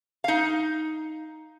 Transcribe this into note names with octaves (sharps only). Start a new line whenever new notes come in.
D#4 F5